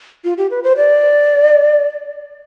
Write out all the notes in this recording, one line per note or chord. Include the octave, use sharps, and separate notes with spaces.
F4
G4
B4
C5
D5